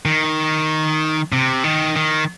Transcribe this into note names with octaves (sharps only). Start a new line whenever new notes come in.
D#3
C3
D#3
D#3